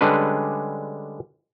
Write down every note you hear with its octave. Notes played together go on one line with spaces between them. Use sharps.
D3 G3 G#3 C#4 D4 B4